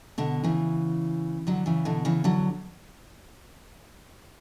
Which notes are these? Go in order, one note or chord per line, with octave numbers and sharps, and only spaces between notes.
B2 D3
C#3 E3
D3 F#3
C#3 E3
B2 D3
C#3 E3
D3 F#3